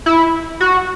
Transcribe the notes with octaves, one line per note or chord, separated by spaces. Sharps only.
E4
F#4